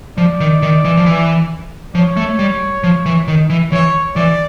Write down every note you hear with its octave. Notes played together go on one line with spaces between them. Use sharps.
F3 D5
D#3
D#3
E3
F3
E3
F3 C#5
A3
G3
F3
E3
D#3
E3
E3 C#5
E3 D5